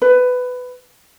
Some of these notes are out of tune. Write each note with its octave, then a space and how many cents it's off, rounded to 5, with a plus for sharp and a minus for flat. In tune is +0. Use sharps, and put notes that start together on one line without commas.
B4 +15